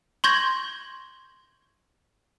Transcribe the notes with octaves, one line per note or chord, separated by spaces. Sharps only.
C6 C#6 G6 G#6 A#6